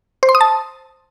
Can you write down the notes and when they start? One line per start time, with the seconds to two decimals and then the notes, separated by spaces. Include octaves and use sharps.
0.23 C5
0.29 C6
0.35 D#6
0.41 A5